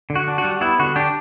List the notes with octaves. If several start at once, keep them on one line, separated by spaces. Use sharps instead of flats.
D3
F#4
D4
F#4
G3
B3 E4
D3 F#4
D4 G4